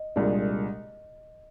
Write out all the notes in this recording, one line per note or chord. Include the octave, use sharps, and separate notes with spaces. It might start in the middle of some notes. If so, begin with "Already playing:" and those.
Already playing: D#5
C2 A#2 G#3 D4